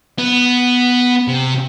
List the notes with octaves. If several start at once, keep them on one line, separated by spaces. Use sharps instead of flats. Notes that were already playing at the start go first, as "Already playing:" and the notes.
B3
C3